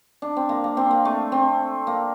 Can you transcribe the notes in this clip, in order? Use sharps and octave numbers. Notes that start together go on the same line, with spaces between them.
D4
C4
A#3
A#3
C4
A#3
A3
C4
A#3